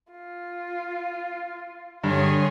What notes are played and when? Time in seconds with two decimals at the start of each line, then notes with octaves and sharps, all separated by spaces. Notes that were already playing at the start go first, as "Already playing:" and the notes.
0.12 F4
2.04 G2 D3 G#4 C#5 C6